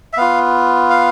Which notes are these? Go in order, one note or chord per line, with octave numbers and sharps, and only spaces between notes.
E5
B3 F4 F5
F5